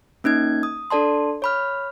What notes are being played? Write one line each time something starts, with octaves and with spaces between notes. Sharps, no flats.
A#3 C#4 D#4 G#6
D#6
D4 A4 D5 A5 C6
C#5 B5 F6